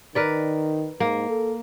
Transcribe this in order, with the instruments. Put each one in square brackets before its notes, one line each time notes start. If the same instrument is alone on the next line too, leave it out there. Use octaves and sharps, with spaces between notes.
[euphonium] D#3 [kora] A#4 B4 D5
[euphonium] G#2 [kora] A#3
[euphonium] A4